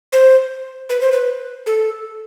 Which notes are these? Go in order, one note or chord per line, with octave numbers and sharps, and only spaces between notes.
C5
B4
C5
B4
A4